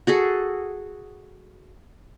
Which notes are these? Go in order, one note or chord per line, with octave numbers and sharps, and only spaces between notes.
F#4 G#4 A4